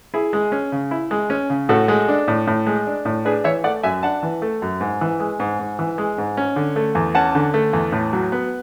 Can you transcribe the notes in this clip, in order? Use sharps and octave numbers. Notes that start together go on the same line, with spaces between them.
E4 G#4
G#3
C#4
C#3
E4
G#3
C#4
C#3
A2 F#4 A4
G#3
D4
A2
A2
G#3
D4
A2
D4 G#4 B4
E3 C#5 E5
A3 D5 F#5
F#2 E5 G#5
D4 F#5 A5
E3
A3
F#2
G#2
E3
G#3
G#2
G#2
E3
G#3
G#2
C#4
D3
A3
E2
C#4 F#5 A5
D3
A3
E2
A2
F#3
B3